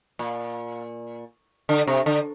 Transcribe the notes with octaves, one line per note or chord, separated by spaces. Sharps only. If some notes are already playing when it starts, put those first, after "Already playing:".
A#2
D3
C3
D3